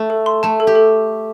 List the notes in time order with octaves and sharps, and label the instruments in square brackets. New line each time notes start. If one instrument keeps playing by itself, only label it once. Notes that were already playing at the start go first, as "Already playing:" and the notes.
Already playing: [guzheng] A3
[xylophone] A4
C6
[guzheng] A3 [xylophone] A5
[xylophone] A4
[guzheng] G4
[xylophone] A4